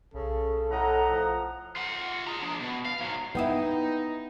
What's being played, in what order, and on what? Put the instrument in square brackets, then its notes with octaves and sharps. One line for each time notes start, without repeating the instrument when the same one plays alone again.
[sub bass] B1 [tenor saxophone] C#3 [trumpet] A4
[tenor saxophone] A2 [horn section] D#5 F#5 A#5
[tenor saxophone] F3
[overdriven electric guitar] F4 F#5
G#4 A#5
D4 G#4
B2
F5
G#2 F#3
[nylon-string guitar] B3 [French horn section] D#4 [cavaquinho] E4 D#5 G5